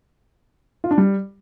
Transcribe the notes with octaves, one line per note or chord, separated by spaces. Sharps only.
F4
D4
G3